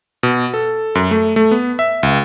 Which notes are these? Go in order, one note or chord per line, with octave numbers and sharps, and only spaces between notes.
B2
A4
F#2
A3
A3
B3
E5
C#2